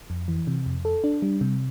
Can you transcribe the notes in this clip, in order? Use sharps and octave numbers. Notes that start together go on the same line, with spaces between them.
F2
E3
C3
F2
A4
D4
G3
C3